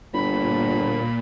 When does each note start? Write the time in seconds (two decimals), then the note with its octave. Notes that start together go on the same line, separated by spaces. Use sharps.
0.14 G1 A#2 B5